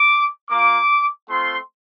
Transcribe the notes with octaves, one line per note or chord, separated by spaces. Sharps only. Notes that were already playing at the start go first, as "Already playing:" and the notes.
Already playing: D6
A#3 F4 D6
A3 C4 F4 C6